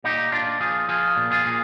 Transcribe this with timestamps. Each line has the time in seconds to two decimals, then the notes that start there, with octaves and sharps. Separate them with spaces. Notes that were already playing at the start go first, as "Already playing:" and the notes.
0.04 A#2 D#4 G4
0.32 A#2 D4 F4
0.60 F3 F4 G#4
0.88 F3 F4 G#4
1.17 A#2
1.31 F4 G#4
1.45 A#2